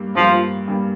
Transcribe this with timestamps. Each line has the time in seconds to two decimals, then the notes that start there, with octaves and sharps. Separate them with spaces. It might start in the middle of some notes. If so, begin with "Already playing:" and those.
Already playing: G2 G3 A#3
0.15 G2 F3 G3 A#3
0.68 G2 G3 A#3